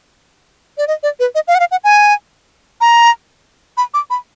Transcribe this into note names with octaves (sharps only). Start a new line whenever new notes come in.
D5
D#5
D5
B4
D#5
F5
F#5
F5
F#5
G#5
A#5
B5
D6
B5